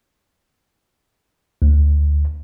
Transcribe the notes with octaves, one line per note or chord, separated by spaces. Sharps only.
D2